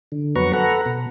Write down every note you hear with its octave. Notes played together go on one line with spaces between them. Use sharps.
D3
F2 F#3 B3 B4 A#5 C#6
A4 B4 F#5 A#5
B2